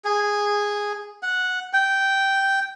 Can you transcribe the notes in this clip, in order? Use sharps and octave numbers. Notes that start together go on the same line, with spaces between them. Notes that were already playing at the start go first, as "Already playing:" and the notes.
G#4
F#5
G5